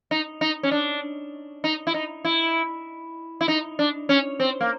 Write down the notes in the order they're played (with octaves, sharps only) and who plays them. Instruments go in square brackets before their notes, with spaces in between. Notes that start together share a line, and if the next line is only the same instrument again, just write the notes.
[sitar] D#4
D#4
C#4
D4
D#4
E4
D#4
E4
E4
D#4
D4
C#4
C4
A#3